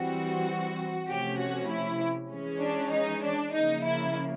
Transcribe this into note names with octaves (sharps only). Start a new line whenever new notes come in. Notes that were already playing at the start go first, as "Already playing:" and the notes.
Already playing: E3 G3 C4 F#4
C3 F3 A3 C#4 G4
F#4
E4
E3 G#3 C#4
D4
D#4
D4
C#3 F3 A#3 D#4
E4